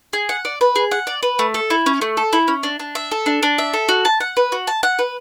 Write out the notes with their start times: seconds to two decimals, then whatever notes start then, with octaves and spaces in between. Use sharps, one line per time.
0.13 G#4
0.29 F#5
0.45 D5
0.61 B4
0.76 G#4
0.91 F#5
1.07 D5
1.23 B4
1.39 A3
1.54 A4
1.70 E4
1.86 C#4
2.02 A3
2.17 A4
2.33 E4
2.48 C#4
2.63 D4
2.79 D4
2.95 E5
3.11 A4
3.26 D4
3.43 D4
3.58 E5
3.73 A4
3.89 F#4
4.05 A5
4.20 F#5
4.37 B4
4.52 F#4
4.67 A5
4.83 F#5
4.99 B4